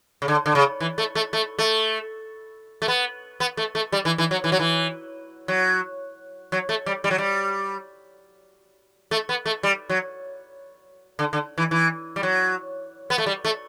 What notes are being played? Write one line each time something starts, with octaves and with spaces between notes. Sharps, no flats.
C#3
D3
D3
C#3
E3
A3
A3
A3
A3
A3
B3
B3
A3
A3
G3
E3
E3
F#3
E3
F#3
E3
F#3
F#3
A3
G3
G3
F#3
G3
A3
B3
A3
G3
F#3
D3
D3
E3
E3
G3
F#3
B3
A3
G3
A3